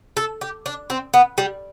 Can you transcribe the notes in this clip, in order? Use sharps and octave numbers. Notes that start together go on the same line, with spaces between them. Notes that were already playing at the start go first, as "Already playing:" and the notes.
A4
G4
D4
C4
B3
G3